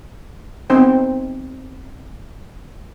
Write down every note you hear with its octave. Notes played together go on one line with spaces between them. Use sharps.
B3 C4 D#4 C5 G5